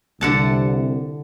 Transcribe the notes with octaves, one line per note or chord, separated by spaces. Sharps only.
C2 D3 F#5 A5